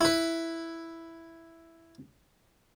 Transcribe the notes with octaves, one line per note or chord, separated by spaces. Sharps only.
E4 B4